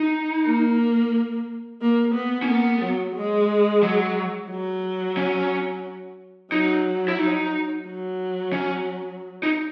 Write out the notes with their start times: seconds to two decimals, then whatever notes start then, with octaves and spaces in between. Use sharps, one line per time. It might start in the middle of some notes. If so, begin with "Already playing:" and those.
Already playing: D#4
0.46 A#3
1.81 A#3
2.14 B3
2.42 C#4
2.48 A#3 B3
2.81 F#3
3.15 G#3
3.83 F#3
4.50 F#3
5.17 C#4
6.52 F#3 D#4
7.08 E4
7.19 D#4
7.87 F#3
8.53 C#4
9.43 D#4